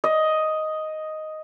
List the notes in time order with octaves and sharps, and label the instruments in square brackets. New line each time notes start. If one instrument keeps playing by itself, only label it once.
[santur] D#5